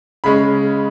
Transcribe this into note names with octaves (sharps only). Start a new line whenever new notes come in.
C#3 G#3 C#4 B5